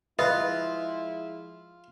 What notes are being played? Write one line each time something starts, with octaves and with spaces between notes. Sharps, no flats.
F3 G#3 E4 F4 B4 D#5 E5 D#6